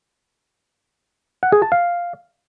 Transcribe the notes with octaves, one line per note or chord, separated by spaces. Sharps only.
F#5
G#4
A5
F5